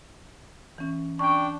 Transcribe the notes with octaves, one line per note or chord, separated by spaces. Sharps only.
E3 C#4
D4 G5 C#6